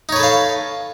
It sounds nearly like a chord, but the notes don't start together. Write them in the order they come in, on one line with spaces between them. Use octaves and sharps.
D#4 C#5 B4 A4 F5